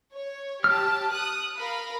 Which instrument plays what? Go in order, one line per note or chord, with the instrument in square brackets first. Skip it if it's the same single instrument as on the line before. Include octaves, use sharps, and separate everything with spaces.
[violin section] C#5
[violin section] G4 A5 [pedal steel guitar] F6
[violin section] D#6 F#6
A#4 F5 B5